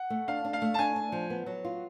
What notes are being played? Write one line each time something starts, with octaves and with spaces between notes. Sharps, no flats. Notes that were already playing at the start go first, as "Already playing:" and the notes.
Already playing: F#5
A3
D4 F5
D4
F5
A3
A5
D4 G#5
D4
F3
B3
F#3
F4